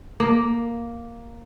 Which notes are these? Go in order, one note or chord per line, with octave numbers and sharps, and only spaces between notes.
A#3